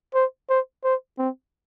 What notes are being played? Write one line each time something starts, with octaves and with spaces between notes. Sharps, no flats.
C5
C5
C5
C4